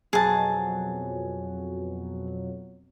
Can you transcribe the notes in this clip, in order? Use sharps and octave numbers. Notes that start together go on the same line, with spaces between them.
F2 B2 F#3 G#4 A5